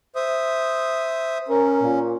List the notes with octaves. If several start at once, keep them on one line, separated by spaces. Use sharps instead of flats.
C5 E5 D#6
C#4 A#4
A#2